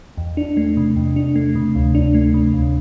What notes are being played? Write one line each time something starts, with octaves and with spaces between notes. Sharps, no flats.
E2
D4
A3
C3
E2
D4
A3
C3
D2
D4
A3
C3
D2